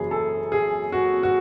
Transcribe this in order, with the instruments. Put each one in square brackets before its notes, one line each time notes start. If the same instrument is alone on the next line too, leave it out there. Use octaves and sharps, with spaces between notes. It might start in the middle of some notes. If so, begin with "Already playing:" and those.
Already playing: [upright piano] F#1 F#2 E3 G#4
A4
G#4
F#4
F#4